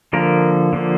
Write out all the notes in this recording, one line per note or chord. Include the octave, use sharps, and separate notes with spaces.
D3 F3 A#3 A#4
D3 F3 A#3